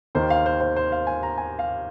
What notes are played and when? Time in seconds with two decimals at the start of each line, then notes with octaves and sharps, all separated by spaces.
0.15 D#2 D#3 A#3 C5
0.30 F5
0.46 C5
0.60 C5
0.76 C5
0.92 F5
1.07 G#5
1.23 A#5
1.38 G#5
1.59 F5